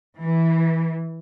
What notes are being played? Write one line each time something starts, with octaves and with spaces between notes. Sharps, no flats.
E3